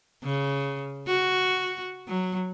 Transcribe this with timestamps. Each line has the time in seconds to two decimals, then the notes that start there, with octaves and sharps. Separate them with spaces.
0.23 C#3
1.07 F#4
2.07 F#3